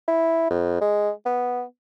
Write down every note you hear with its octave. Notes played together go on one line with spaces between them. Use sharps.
E4
F2
G#3
B3